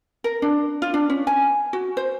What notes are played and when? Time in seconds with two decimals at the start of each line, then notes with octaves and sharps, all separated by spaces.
0.24 A#4
0.42 D4
0.82 F4
0.94 D4
1.10 C#4
1.27 G#5
1.73 F#4
1.97 C5